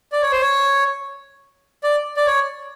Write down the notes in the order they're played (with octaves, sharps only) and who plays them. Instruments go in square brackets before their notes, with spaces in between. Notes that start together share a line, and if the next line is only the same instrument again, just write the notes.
[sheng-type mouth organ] D5
C#5
C5
C#5
D5
D5
C#5